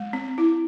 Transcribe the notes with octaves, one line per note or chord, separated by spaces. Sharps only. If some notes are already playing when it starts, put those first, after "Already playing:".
Already playing: G#3
C4
E4